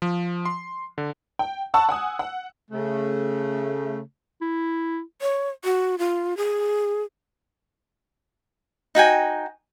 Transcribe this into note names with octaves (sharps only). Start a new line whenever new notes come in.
F3
C6
D3
G5
F#5 A5 C#6 E6
F#5 G#5 D#6
F#5
C#3 A3
E4
C#5
F#4
F4
G#4
D#4 F#4 G5 G#5